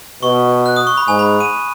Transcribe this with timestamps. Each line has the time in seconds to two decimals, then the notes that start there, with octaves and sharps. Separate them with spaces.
0.23 B2 C#6
0.66 F#6
0.76 D#6
0.87 C#6
0.97 B5
1.08 G#2 G#5
1.19 B5
1.40 D#7